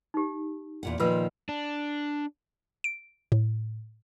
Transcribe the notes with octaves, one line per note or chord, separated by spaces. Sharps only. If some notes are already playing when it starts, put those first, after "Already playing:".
D#4 G4
E2 A#2 F#5
A#2 D#3 F3 F4 B4 E6
D4
D7
A2